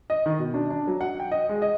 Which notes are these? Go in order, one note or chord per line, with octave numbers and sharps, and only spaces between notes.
D#5
D#3
B2
D4
D4
F#3
F#5
G5
D#5
G#3
D#5